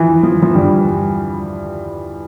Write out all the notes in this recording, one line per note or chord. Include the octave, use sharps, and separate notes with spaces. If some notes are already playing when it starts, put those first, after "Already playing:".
Already playing: E3 F3
F3
F3
G2 G3